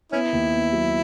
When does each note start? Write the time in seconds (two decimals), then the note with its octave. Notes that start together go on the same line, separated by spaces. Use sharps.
0.12 B3 C#4 E4
0.32 D#2
0.53 B3
0.73 F#3